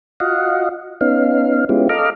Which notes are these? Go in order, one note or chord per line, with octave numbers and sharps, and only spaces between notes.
F4 F#4 D#5 F5 F#5
B3 C#4 D#4 F5
G#3 B3 C#4 E4 F4 G4
A4 D#5 F5 A#5 D6 F6